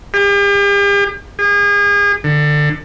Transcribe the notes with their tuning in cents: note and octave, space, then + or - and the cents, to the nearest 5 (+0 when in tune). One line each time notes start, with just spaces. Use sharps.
G4 +45
G#4 -35
D3 +25